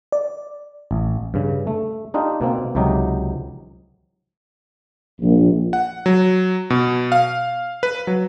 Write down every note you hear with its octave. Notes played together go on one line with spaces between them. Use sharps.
D5
A1
G2 C#3
A3
D4 D#4 F4 G4
B2 A#3 C4
C#2 C3 F#3 D#4 G4
A#1
F#5
F#3
B2
F5
B4
F#3